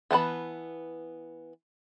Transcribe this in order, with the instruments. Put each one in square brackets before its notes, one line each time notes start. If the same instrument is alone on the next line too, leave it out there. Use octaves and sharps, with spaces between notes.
[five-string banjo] E3 B3 A5 B5